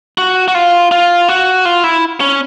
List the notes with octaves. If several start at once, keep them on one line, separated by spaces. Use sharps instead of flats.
F#4
F#4
F4
F4
F#4
F4
E4
C#4